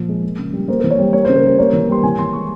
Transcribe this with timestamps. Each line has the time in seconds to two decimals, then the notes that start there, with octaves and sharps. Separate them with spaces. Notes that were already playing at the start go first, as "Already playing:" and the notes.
Already playing: A#2 F3
0.09 G#3
0.24 A#3
0.39 C#3
0.53 G3
0.68 A#3 C5
0.80 E3 A#4
0.91 C#5
0.99 G3
1.13 A#3 C#5
1.25 C#3 C5
1.36 A#4
1.44 G3 C5
1.58 A#3 C#5
1.73 E3
1.89 G3 C6
2.03 E3 G#5
2.18 E3 C6
2.33 G#3 C#6